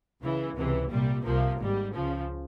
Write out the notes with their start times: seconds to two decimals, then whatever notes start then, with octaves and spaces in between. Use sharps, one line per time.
0.21 C#2 C#3 E3
0.55 C#2 C3 E3
0.89 C2 A#2 G3
1.24 C2 C3 F3 A#3
1.58 G#1 G#2 G3
1.92 C#2 C#3 F3